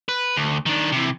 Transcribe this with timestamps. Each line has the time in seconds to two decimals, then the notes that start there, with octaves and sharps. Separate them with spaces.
0.09 B4
0.36 D2
0.66 D#3 D4
0.92 C3 E3